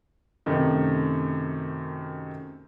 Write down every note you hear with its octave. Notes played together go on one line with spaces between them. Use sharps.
F#2 C3 D#3 A3